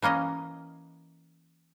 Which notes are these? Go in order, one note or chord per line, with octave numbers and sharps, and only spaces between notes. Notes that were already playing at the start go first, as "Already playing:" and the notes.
E3 A#3 C#4 D#5